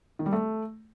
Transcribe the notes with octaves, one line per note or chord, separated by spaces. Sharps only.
D#3
G3
A3